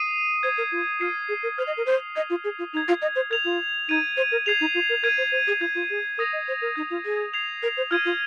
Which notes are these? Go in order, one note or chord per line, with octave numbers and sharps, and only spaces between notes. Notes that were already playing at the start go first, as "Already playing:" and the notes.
Already playing: D#6 C7 D#7
C5 G#6 D#7
A#4
F4
F4 F6 C7 D#7
G#4
A#4
C5 F6 G#6 F7
D#5
A#4
C5
D#5 D#6 G#6 F7
F4
G#4
F4
D#4 G#6 F7
F4
D#5
C5
A#4 G#6 F7
F4
D#4 G#6 D#7
C5
A#4
G#4 G#6 C7 F7
D#4
F4
A#4
A#4 G#6 D#7
C5
C5
G#4
F4 G#6 F7
F4
G#4
A#4 D#6 A#6 F7
D#5
C5
A#4
D#4 G#6 F7
F4
G#4
D#6 G#6 C7 F7
A#4
C5
F4 F6 G#6 D#7
F4